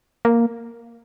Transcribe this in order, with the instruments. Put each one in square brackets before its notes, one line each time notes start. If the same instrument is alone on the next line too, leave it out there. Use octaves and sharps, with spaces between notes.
[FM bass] A#3